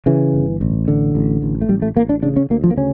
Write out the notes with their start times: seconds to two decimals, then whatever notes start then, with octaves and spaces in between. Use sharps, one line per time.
0.06 C#3 E3
0.34 G1
0.61 A1
0.88 D3
1.15 A1
1.42 A1
1.61 A3
1.69 A1 G3
1.82 A3
1.96 A1 A#3
2.09 D4
2.23 C#3 D4
2.36 C#4
2.50 D2 A#3
2.64 F3
2.71 A#3
2.77 C#3 C#4